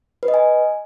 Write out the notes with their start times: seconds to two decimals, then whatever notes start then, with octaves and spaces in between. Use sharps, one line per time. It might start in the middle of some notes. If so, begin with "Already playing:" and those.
0.23 B4
0.28 D#5
0.34 G#5